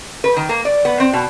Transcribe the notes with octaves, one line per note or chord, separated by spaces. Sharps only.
B4
D#3
A#3
D5
B3
C4
B2